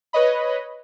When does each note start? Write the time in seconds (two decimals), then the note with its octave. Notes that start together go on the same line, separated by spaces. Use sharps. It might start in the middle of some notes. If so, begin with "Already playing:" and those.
0.13 B4 C#5 D#5 B5